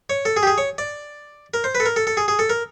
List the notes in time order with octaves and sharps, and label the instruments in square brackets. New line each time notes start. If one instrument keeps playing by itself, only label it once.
[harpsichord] C#5
A4
G#4
G4
G#4
C#5
D5
A#4
C5
B4
A4
A#4
A4
A4
G#4
G#4
A4
A#4